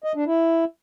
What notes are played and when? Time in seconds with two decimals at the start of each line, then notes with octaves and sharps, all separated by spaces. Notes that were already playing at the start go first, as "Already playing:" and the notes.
0.04 D#5
0.15 D4
0.27 E4